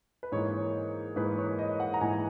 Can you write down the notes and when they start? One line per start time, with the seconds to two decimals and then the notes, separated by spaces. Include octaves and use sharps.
0.23 B4
0.32 G#2 E3 A#3 C#5
1.16 G#2 E3 A#3 B4
1.38 C#5
1.59 D#5
1.80 F#5
1.94 A#5
2.01 G#2 E3 A#3 G#5